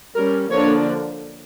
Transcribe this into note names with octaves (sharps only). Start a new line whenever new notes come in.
G3 C#4 A#4
D3 F3 A#3 D4 C#5